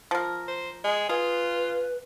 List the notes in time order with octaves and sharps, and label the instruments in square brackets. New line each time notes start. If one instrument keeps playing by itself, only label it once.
[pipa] F3 A#4
[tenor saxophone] C5
[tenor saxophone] G#3 [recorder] G#5
[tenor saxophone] F4 [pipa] G#4 [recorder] B4